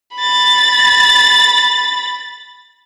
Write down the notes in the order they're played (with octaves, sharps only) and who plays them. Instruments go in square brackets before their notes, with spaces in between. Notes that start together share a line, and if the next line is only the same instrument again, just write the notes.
[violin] B5 A6